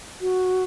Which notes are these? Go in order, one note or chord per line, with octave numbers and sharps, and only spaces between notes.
F#4